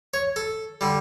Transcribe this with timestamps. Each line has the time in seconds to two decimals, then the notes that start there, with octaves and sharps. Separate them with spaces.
0.14 C#5
0.36 A4
0.81 D3 G3